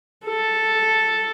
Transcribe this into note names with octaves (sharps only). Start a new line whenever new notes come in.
A4